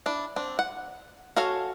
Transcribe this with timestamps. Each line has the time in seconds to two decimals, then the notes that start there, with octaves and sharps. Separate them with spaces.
0.06 D4 E4
0.36 C4 D4
0.59 F#5
1.37 F#4 A4 C#5 F5 G#5